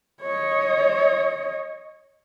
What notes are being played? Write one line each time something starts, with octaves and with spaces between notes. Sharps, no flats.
C#5 D#5